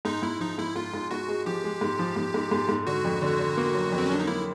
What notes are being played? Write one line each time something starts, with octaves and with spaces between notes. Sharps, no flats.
G#2 D#4
G#2 E4
F3 D#4
G#2 E4
G#2 F4
G#2
G#2 F#4
G#3
F3 G4
G#3
G#2
F3
G#2
G#2
G#2
G#2
D3 F#4
F2
D3
D3
A#3
F#3
F2
C4
C#4
F#3 D4
D#4
A#3 E4